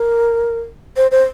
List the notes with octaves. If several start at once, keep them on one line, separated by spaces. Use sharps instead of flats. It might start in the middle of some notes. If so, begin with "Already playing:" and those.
Already playing: A#4
C5
C5